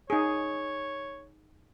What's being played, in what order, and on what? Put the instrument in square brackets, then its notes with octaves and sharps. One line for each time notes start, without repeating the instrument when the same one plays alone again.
[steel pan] D#4 G#4 [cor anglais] C#5